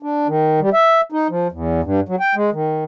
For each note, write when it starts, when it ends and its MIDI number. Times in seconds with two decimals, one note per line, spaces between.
0.03 0.27 62
0.28 0.60 51
0.60 0.70 55
0.73 1.01 76
1.12 1.28 63
1.30 1.48 53
1.52 1.81 40
1.84 2.00 43
2.09 2.16 54
2.20 2.35 79
2.35 2.50 56
2.53 2.84 51